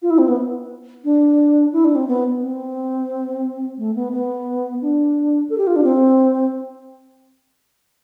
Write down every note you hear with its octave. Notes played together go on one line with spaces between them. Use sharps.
F4
E4
C4
B3
D4
E4
D4
C4
B3
C4
A3
B3
B3
D4
A4
G4
F4
D4
C4